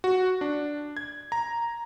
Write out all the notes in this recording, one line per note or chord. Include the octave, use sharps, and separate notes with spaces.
F#4
D4
G#6
A#5